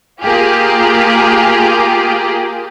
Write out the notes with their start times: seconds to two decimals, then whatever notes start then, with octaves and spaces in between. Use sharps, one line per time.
0.22 A#3 F4 G4 G#4